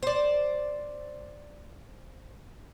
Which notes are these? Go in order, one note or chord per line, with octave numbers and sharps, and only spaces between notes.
C5 D5